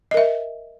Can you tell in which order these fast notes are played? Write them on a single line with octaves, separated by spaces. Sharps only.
D#5 A#4 E5